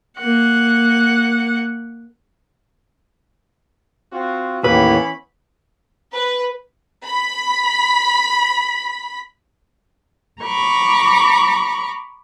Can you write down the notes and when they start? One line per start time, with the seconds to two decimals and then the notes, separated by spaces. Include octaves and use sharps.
0.18 A#3 F#5
4.12 C4 F4 F#4
4.64 D#2 A2 E3 A#3 B3 C#4 B4 B5
6.13 B4
7.05 B5 B6
10.41 A#5 B5 C#6 D6